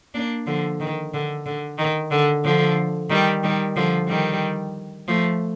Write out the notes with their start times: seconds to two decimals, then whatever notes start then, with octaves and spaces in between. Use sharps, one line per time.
0.14 A#3 D4
0.46 D3 F3
0.80 D#3
1.13 D3
1.46 D3
1.78 D#3
2.11 D3
2.44 D3 F3
3.10 D#3 G3
3.43 D#3 G3
3.76 D3 F3
4.09 D#3 G3
5.08 F3 A3